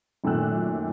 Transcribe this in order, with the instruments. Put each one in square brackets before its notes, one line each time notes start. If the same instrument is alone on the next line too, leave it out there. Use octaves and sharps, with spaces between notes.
[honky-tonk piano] F#2 A#2 D#3 A3 E6 F#6